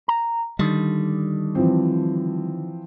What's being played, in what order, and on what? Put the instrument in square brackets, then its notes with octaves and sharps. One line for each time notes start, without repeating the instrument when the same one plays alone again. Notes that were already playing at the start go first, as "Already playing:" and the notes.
[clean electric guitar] A#5
[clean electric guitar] D3 D#3 [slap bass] G3
[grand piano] E3 F3 C4